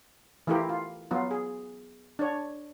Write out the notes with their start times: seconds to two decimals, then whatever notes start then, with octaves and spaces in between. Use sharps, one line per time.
0.47 E3 A3 E4 F4 G4 A#4
0.69 F4
1.11 F#3 B3 F4
1.31 G#4
2.19 D4 C#5